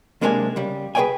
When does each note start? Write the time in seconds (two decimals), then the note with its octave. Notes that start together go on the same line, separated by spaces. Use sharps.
0.21 B1 C3 G#3 A#3 D4 G#5
0.56 C#3 G3
0.95 G#4 B4 C5 D5 G5 G#5